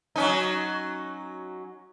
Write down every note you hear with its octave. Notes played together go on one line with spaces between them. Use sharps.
F#3 C#4 D#4